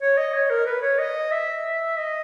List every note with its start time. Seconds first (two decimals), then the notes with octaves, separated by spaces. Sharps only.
0.01 C#5
0.18 D#5
0.34 C#5
0.50 A#4
0.67 B4
0.82 C#5
0.99 D#5
1.31 E5
1.97 D#5